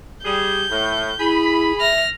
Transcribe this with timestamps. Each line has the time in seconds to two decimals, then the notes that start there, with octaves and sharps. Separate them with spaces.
0.25 G3 G#4 G6
0.70 A2
1.19 E4 G#4 B5
1.80 E5 F6 A#6